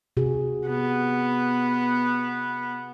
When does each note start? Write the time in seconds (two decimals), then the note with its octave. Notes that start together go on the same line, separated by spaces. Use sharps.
0.17 C3 F#4 G#4
0.68 B3